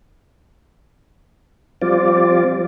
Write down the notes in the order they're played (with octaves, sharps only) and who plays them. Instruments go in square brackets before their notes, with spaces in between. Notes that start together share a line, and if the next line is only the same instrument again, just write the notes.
[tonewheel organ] F3 G3 C4 F4 D5